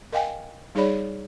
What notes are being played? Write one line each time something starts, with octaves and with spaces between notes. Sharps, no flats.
A#4 D#5 F5 G5 G#5
G3 D#4 G#4 C#5 D5 B5